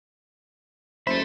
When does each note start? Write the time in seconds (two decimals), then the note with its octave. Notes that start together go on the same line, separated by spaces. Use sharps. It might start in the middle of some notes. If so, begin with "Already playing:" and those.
1.07 F#1 A4 C5 E5 B5